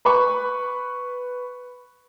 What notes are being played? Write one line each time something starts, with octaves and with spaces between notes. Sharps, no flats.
B4 B5 C#6